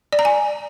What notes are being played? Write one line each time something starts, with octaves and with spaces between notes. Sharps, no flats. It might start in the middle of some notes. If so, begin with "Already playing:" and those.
D5
A#5
G#5